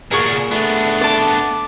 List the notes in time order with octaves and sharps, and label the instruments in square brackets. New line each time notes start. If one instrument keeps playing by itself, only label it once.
[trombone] A#2 [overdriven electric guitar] C#3 D4 [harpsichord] F#4 G#4 A#4
[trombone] A3 [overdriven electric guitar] B3 D4
[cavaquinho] D5 A5